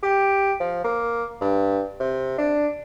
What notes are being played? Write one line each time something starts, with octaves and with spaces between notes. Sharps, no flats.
G4
F3
A#3
G2
C3
D4